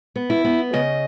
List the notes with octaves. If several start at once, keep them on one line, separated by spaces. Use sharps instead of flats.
B3
E4
B3
C#3 D#5